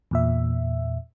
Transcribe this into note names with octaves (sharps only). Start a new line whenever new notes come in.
E2 A#2 E5